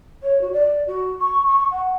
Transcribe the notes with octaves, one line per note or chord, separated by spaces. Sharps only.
C#5
F#4
D5
F#4
C#6
C#6
F#5